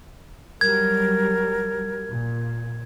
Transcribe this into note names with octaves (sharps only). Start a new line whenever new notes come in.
F#3 G3 A#4 G#6
A#2